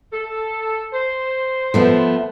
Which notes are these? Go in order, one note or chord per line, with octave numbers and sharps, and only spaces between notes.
A4
C5
F3 A3 B3